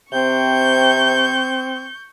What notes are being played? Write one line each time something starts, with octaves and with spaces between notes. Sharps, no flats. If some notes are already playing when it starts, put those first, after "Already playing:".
C3 C4 C#6 G6